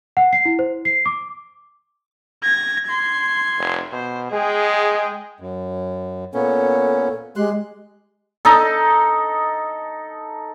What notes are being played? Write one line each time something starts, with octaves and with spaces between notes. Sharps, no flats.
F#5
C7
E4
C5
C7
D6
G#6 A#6
C6 G#6
F1
B2 C5
G#3 G#4 G5
F#2
A#2 B3 C#4 A4
G#3 G4 C6 F#6
D#4 A4